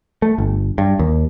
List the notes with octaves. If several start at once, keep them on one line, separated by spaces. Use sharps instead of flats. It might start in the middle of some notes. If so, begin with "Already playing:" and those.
A3
G1
G2
D#2